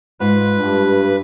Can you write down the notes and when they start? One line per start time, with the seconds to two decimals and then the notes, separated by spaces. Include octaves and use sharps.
0.20 G#2 F4 B4
0.56 G2